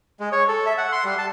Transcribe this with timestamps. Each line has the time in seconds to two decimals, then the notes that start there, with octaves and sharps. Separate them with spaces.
0.20 G#3
0.32 C#5
0.48 A4
0.66 E5
0.78 F#5
0.92 C6
1.04 G3
1.18 A5